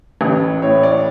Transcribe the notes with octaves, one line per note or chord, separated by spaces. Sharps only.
A1
A2 C#5
D5